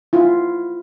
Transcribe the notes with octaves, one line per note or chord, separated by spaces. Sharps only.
E4 F4